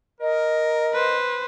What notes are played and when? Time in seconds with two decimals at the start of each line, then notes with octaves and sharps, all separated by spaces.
0.21 A#4 D#5
0.93 B4 C5